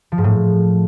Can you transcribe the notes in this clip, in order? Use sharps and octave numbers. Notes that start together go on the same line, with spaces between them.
F3
G#2
A2